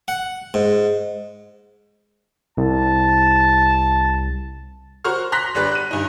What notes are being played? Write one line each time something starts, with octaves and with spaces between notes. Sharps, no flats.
F#5
G#2
C2 A5
F#4 A#4 C5 C#6 F6
A#5 C6 F#6 A#6 B6
G1 G3 D4 B4 F#6
F#6 D#7
G2 D#4